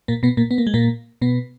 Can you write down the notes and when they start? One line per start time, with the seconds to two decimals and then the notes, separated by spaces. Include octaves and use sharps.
0.08 A#2 A#3
0.23 B2 B3
0.37 A#2 A#3
0.51 B3
0.58 A#3
0.67 G#3
0.74 A#2 A#3
1.21 B2 B3